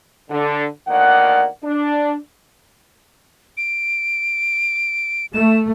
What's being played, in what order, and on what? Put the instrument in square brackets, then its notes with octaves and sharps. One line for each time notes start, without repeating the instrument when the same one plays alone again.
[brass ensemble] D3
D2 D#3 A#3 D5 F#5
D4
[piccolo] D7
[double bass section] A3 [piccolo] E7